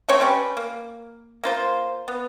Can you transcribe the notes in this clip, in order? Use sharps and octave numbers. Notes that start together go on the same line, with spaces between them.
A3 C4 C5 C#5
G3 C#4 G4 B4
A#3
A#3 F4 C5
B3